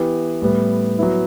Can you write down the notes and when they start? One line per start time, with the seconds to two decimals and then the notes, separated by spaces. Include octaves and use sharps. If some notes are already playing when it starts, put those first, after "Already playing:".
Already playing: E3 B3 E4 G4
0.42 A2 G3 B3
0.98 F#3 B3 E4